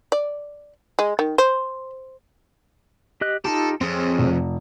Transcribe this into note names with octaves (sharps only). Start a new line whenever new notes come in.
D5
G#3
D#3
C5
G4 D#5 F#6
D#4 F4 G4 A4
F2 C4 G#4 C#5
F1